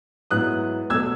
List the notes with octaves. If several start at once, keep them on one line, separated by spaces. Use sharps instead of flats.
G#2 F#3 B3 E4 D#6 F#6
B2 F#3 A3 E6 G#6